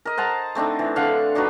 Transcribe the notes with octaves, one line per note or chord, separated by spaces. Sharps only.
A#4 D#5
C5 F#5 A5 A#5
A3 C4 D4 D#4
E3
D3 F5 F#5
D4 D#4 F#4 B4